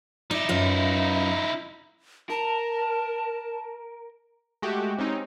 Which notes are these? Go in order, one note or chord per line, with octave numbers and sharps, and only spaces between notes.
D#4 E4 D5
F#2 F4 B4
A#4 A5
G#3 A3 F#4 G4
C4 C#4 D#4